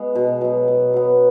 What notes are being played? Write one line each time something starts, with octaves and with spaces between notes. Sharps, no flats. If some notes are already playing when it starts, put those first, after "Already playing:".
Already playing: G#3 B3
B2
F#3 B3
B2
F#3 B3